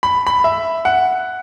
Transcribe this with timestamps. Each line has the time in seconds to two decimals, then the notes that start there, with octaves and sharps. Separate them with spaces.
0.03 B5
0.27 B5
0.44 E5
0.85 F#5